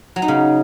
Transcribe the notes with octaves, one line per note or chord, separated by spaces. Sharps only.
F#3
D#4
C#3